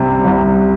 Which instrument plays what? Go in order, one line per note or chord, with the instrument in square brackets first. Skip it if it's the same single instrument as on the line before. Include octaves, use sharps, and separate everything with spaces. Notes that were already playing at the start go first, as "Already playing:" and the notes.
Already playing: [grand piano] C2 C3 G3
C2